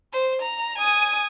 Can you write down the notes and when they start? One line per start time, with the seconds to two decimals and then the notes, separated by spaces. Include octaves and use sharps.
0.13 C5
0.42 A#5
0.78 G#5 D#6